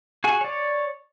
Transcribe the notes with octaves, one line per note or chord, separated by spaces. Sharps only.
F#4 G#4 G#5
C#5 D5